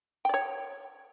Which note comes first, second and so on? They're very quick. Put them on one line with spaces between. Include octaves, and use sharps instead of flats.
G5 D5 C#5